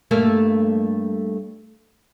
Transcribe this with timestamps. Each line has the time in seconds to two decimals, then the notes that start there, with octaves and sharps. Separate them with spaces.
0.11 G2 A3 A#3